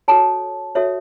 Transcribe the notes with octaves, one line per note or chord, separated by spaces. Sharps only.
F#4 A4 C#5 A5
F#4 A4 C#5 E5